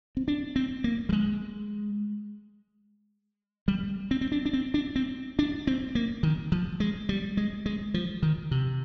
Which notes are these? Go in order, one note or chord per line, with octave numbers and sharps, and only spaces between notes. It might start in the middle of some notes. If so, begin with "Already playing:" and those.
C4
D4
C4
A#3
G3
G#3
G3
C4
C4
D4
D4
C4
D4
C4
D4
C4
A#3
D#3
F3
G#3
G3
G#3
G#3
F3
D#3
C3